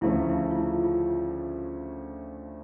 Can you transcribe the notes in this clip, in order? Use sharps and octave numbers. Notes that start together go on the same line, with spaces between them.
D2 C#3 F3 A3 C#4 E4
E4
F4
E4
F4